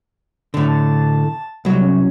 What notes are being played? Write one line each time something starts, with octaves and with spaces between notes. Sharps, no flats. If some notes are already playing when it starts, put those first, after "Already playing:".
A2 D3
A5
C2 F#3 G3
C#4